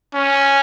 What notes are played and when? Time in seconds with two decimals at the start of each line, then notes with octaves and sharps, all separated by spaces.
0.15 C#4